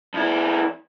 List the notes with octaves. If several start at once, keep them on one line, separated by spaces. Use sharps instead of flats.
F2 E4